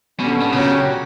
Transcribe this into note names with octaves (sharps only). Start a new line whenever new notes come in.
B2 D3 G3 C#4
B2
A#2 C#3 F#3 C#4 G4